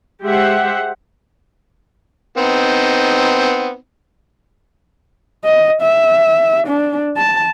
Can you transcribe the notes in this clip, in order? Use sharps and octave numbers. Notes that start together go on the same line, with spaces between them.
G#3 G4 C5 E5 F#5
B3 C4 D#4
D#5
E5
D4
A5